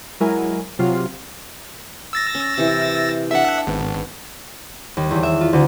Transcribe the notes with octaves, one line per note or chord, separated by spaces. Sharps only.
F#3 G#3 E4 A#4 G#5
C3 F#3 F4
E6 A6 A#6
C#4
C3 E3
D4 A4 E5 F#5
G#1 B3
D#2
E2
E5
F4
D2